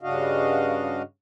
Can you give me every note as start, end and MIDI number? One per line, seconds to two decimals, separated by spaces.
0.02 1.02 43
0.02 1.02 49
0.02 1.02 62
0.02 1.02 66
0.02 1.02 75
0.02 1.02 77